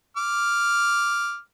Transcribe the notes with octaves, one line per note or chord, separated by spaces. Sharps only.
D6 F6